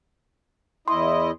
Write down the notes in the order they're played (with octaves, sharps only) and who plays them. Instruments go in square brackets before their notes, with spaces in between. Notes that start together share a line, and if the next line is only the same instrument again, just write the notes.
[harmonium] E2 E4 D#5 [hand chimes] C6